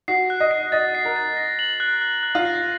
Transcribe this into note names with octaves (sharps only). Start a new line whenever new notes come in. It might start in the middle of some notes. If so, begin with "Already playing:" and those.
F#4 C7
F#6
D#5
C7
D#5 A6
C7
A#4
A6
A#6
F#7
F#6
F#6
F#6
F4
A#6